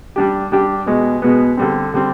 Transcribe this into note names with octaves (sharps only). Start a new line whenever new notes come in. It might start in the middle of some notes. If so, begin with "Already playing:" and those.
G3 D4 G4
G3 D4 G4
B2 G#3 B3
B2 G#3 B3
D3 G3 C4
D3 G3 C4